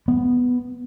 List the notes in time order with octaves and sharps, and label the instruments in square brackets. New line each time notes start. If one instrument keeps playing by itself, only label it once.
[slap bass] B3